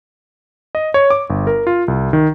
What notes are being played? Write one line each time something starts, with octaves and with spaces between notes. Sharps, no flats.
D#5
C#5
D6
G1
A#4
F4
C2
D#3